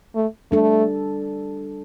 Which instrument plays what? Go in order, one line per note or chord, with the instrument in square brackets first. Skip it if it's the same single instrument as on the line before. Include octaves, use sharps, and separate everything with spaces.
[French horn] A3
[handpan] G3 D4 A4 [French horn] A3